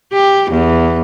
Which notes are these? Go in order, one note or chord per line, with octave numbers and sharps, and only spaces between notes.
G4
E2